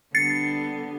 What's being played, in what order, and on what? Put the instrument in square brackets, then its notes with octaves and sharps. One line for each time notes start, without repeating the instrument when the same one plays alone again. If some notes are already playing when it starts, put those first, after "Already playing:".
[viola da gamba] D3 G3 B3 [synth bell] A6 C7 C#7